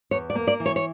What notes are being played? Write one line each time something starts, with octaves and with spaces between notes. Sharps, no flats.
E2 C#5
D5
A#3
D5
E3
C#5
C#5